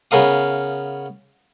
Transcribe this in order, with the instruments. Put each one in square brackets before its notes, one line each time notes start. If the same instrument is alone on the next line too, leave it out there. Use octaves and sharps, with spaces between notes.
[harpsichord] C#3 B3 A#4 F5 D#6